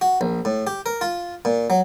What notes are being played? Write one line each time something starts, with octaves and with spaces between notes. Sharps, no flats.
F#4
A#1
A2
G4
A#4
F4
A#2
F#3